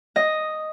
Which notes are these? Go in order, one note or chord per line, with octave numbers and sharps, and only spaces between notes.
D#5